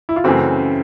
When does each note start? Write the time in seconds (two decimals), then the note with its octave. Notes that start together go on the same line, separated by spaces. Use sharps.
0.09 E4
0.16 F4
0.24 F#2 C#3 E3 A3 C4 F#4